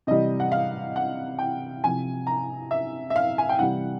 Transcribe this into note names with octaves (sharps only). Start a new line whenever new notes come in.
C3 E3 G3 D#5
F#5
F5
F#5
G5
C3 F3 G#5
A#5
E5
E5
F5
G#5
G5
C3 E3 G3 F#5